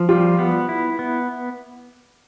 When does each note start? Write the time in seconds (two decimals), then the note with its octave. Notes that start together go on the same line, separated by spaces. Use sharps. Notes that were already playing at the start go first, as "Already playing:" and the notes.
Already playing: F3
0.09 G3 F4 G4
0.39 B3
0.69 E4
0.99 B3